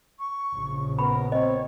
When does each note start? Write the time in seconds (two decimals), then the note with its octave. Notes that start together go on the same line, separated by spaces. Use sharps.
0.18 C#6
0.54 A#1 C#3
0.99 B3 A#4 B5
1.32 C4 C#5 D#5